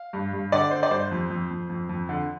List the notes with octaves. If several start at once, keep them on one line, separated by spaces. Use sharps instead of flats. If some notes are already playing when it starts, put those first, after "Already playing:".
Already playing: F5
G2
G2
D3 D5
D3 C5
D5
G2 C5
F2
F2
F2
F2
F2
D3